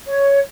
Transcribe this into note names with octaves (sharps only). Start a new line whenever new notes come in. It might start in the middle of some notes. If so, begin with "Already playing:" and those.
C#5